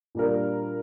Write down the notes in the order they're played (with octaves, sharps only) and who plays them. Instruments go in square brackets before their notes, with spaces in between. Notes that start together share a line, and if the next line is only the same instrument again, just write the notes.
[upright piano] A#2 G3 D4 F4 A#4